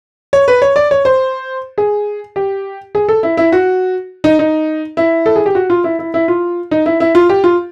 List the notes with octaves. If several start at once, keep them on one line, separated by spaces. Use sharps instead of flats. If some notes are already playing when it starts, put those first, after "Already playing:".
C#5
B4
C#5
D5
C#5
C5
G#4
G4
G#4
A4
E4
E4
F#4
D#4
D#4
E4
A4
G#4
G4
F#4
F4
E4
E4
E4
F4
D#4
E4
E4
F4
G4
F4